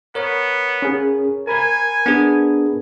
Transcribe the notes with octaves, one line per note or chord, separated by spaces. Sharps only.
B3 A#4 C#5
C#4 G#4
A#4 G#5 B5 G#6
B3 D4 G#4